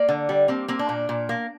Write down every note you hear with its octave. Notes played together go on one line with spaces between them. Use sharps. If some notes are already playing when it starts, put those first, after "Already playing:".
Already playing: A#3 D5
D3
G3
A#3 C4
A#3 C4
D4
A#2
A#2
A#3